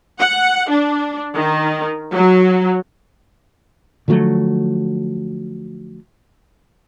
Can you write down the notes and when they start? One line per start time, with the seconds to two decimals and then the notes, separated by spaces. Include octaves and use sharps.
0.19 F#5
0.70 D4
1.34 D#3
2.12 F#3
4.08 D3 F3 F#3 A3